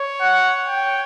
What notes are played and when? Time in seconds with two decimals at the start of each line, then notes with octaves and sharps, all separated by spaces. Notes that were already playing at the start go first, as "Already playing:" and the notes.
Already playing: C#5
0.21 F#5
0.68 G5